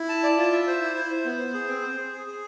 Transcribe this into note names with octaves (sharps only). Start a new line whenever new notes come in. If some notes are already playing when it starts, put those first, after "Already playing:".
Already playing: E4
A5
D5
F4
E5
C5
E4
E4
C5
B3
C5
G#4
C4
C5
G#4
G#4
G#4